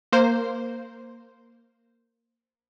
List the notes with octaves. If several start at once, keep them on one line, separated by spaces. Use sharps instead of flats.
A#3 C5